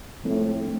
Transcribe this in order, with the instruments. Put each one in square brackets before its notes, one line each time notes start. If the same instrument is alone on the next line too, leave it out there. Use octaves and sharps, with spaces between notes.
[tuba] A2 [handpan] F3 G#3 C4 E4 A4
[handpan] A3 D4